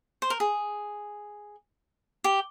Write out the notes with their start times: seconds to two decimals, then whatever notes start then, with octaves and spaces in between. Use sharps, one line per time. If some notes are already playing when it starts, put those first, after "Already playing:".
0.22 C5
0.30 A#4
0.40 G#4
2.24 G4